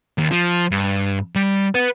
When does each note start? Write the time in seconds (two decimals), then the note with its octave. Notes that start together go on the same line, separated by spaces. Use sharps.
0.18 D#2
0.32 F3
0.71 G2
1.36 G3
1.75 B4 F#5